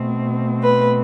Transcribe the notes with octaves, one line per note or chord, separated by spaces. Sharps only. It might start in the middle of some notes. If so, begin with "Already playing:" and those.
Already playing: B2 A3 C4
B4